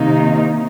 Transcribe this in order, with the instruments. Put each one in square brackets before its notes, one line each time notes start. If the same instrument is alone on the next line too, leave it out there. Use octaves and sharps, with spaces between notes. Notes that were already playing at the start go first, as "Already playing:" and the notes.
Already playing: [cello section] C3 D#3 A#3 D#4